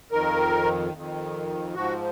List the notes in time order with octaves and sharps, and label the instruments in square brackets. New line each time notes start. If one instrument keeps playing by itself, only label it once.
[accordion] F2 D#3 A#4
F2 D#3
G#2 F3 F#4